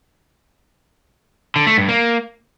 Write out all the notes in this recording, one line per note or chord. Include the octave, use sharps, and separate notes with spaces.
D3
A3
G2
A#3